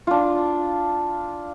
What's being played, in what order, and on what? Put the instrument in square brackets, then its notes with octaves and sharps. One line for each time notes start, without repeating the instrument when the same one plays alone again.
[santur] D4 F4